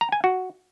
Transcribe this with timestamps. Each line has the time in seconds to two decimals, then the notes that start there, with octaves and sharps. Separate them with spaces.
0.01 A#5
0.12 G#5
0.24 F#4